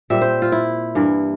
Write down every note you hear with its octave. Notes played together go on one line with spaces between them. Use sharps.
A#2 G3 C4 E5
C5
F4
E4
G2 E3 A#3